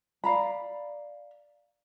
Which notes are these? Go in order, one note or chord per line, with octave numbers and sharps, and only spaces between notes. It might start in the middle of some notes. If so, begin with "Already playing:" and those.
D5 F5 A#5 B5